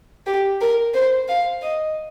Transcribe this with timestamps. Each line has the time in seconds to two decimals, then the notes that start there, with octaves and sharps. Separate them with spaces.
0.26 G4
0.61 A#4
0.94 C5
1.28 F5
1.62 D#5